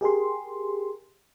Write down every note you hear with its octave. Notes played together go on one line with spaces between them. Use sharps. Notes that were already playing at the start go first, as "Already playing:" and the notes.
G4 G#4 A#4 C6